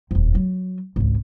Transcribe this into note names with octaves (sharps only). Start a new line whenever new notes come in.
D#1 F2
F#3
G#1 C#2